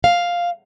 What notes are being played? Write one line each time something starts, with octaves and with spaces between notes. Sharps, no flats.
F5